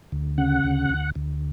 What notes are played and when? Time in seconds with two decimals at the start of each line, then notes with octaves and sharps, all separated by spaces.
0.12 D2
0.38 C#3 F#5
0.64 D2
0.90 D2
1.15 D2